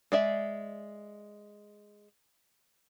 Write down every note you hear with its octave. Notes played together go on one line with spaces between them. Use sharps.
G#3 D5 E5